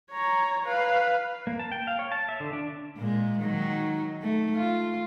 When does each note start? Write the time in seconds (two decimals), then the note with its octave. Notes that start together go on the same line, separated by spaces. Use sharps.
0.11 C#5 A#5
0.66 B4 F5
1.47 A#3
1.59 A5
1.72 G5
1.87 F5
1.99 C#5
2.12 A5
2.29 E5
2.40 D3
2.53 D4
2.97 A#2 G#3
3.39 D#3 F#3 D#4
4.22 A3
4.55 F4